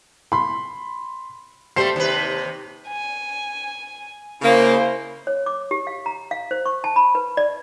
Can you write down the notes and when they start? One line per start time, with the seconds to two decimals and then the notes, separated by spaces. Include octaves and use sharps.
0.32 B5 C6
1.76 G3 A3 G4 C5 C7
1.96 D#2 C3 B4
2.88 G#5
4.42 C#3 A#3 E4 C5
5.27 C#5
5.46 D6
5.71 G4
5.87 F5
6.06 A#5
6.31 F5
6.51 C5
6.66 C#6
6.84 A5
6.96 B5
7.15 B4
7.37 D5